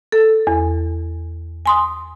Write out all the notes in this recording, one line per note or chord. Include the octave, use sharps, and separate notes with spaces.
A4
E2
G#5 C6 D#6